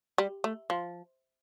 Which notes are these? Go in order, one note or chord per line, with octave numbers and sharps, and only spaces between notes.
G3
A3
F3